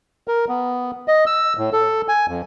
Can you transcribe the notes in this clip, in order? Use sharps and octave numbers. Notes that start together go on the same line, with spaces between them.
A#4
B3
D#5
E6
A2
A4
G#5
F2